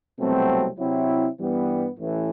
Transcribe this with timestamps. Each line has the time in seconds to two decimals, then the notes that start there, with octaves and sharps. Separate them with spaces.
0.19 C2 B2 F#3 A3 C4
0.79 C3 F#3 C4 E4
1.40 G2 E3 G3 B3
2.00 A1 A2 E3